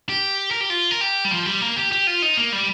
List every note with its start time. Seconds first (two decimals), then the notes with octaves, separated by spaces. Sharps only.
0.09 G4
0.51 A#4
0.61 G4
0.70 F4
0.91 A#4
1.01 G4
1.25 G3
1.31 F3
1.46 G3
1.61 A#3
1.76 G4
1.92 G4
2.07 F4
2.22 D#4
2.37 A#3
2.53 G3